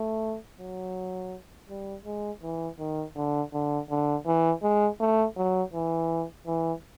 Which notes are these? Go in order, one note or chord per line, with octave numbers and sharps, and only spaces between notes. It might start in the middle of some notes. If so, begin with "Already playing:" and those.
Already playing: A3
F#3
G3
G#3
E3
D#3
D3
D3
D3
E3
G#3
A3
F#3
E3
E3